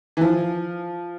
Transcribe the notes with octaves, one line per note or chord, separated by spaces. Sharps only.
E3
F3